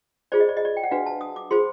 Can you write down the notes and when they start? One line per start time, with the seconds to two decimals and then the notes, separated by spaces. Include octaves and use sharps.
0.32 F4 G#4 C5 D5
0.40 D#5
0.49 D5
0.57 D#5
0.65 D5
0.77 G5
0.83 F#5
0.91 D4 F#4 B4 F5
1.06 A5
1.21 D#6
1.36 D6
1.51 F4 G#4 C5 C6